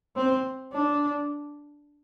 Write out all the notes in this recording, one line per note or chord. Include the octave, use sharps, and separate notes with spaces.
C4
D4